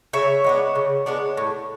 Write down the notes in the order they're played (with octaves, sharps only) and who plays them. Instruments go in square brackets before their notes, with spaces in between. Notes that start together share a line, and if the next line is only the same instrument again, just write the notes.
[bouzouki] C#3 C#5 E5
G#3 B3 D4
C#3
G#3 B3 D4
A2